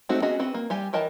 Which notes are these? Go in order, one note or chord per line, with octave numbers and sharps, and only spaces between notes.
G#3 A3 C4 D#4 F#4
B3 C#4 F#4 G#4 D#5
C4 F#4 B4
A#3
G3 G4 G#5
E3 A#4 D#5 G5 A5